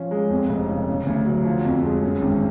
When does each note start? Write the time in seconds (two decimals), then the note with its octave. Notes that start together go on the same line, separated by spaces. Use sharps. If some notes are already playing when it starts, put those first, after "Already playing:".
Already playing: F3 C#4
0.11 G#3
0.30 F2
0.50 F1
0.69 C#3
0.88 C#3
1.07 D2
1.27 F#3
1.45 F3
1.64 F2
1.84 G#3
2.03 F#2
2.22 G#1